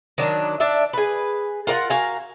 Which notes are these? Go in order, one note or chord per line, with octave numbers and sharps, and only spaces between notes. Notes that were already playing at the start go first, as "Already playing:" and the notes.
D#3 F#3 D4
D4 D5 E5
G#4 B4
F4 A#4 C#5 F#5
F#4 A#4 F5 G#5